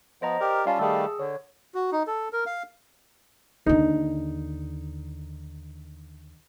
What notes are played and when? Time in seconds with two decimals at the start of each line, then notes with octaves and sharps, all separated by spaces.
0.22 F3 B3 C5 D#5 A#5
0.41 G4 A#4 D5 F6
0.66 G3 C#4 F4 D5 F5 A5
0.79 D#3 G3 A3 G#4 E6
1.20 D3 C#5
1.74 F#4
1.92 D#4
2.07 A4
2.33 A#4
2.46 F5
3.66 D#2 D3 D#4